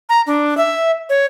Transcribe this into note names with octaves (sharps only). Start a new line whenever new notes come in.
A#5
D4
E5
C#5